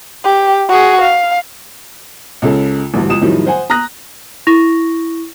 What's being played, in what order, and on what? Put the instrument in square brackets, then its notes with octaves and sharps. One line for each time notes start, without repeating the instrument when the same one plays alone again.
[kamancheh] G4
F#4 G#4
F5
[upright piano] C#2 C#3 A4
A1 D2 G2
C#2 D#6 E7
F2 A2 D#3 F#3 G3
C5 F#5 G#5
A#5 D#6 F#6 A#6
[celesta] E4 C#6 A#6 F7